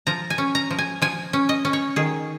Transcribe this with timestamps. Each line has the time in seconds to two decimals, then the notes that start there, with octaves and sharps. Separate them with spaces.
0.07 F3 A#5
0.30 G#5
0.38 C#4
0.55 A#5
0.70 F3
0.79 G#5
1.02 F3 G#5
1.33 C#4
1.49 D#5
1.65 C#4
1.73 C#5
1.96 D#3 G#4